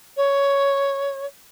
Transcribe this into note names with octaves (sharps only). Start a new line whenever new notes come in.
C#5